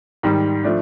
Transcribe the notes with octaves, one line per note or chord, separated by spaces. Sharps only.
G#2 D#3 G3
F3 A3 D4